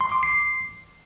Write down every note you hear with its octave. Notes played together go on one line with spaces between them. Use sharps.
C6
D6
C7